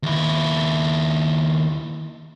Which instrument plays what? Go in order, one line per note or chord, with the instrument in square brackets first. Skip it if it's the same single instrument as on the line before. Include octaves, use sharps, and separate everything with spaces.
[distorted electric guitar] D#2 E4